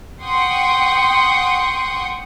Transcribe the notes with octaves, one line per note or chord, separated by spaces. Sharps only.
F#5 G5 C6 C#6 D#6